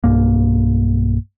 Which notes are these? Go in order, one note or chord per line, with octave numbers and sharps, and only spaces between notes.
B1 G2 A#3